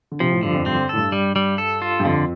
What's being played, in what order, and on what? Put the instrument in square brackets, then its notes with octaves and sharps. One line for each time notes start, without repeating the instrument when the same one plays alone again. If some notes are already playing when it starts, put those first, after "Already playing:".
[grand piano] D3
[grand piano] C3 [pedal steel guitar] F3
[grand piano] A2
[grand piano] G2 [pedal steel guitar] D3
[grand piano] F2
[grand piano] G2 [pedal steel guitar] C4
[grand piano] A2 [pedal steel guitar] A4
[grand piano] G2
[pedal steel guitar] G3
G3
A4
F4
[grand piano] G2
[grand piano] F2 [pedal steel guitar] D3